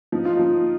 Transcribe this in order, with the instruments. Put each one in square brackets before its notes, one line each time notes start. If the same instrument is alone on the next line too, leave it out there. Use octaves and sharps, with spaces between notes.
[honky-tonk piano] F3 [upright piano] D#4
[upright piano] F4
[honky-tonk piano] F3 [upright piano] D#4